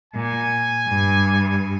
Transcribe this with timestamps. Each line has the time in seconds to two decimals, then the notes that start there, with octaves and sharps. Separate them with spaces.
0.13 A#2 G#5
0.87 G2